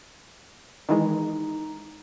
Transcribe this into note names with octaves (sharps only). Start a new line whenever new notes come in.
D#3 E3 G#3 D#4 A#5